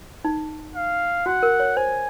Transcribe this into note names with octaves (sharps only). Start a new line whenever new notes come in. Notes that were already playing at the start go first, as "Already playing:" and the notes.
D#4
F5
F#4 F#5
A#4
C#5
C5 G#5